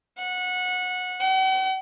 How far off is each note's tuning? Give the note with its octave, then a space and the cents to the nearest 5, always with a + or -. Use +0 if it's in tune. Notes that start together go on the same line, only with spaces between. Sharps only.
F#5 -20
F#5 +45